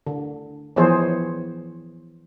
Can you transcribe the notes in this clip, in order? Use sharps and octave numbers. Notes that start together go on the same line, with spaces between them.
D3
E3 F3 B3 G#4 C5 C#5